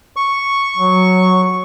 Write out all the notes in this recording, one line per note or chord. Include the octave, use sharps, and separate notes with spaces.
C#6
F#3